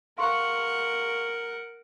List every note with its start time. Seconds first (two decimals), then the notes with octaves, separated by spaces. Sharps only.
0.18 A#4 F5 F#5 C6 C#6